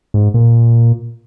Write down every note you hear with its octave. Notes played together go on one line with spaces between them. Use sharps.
G#2
A#2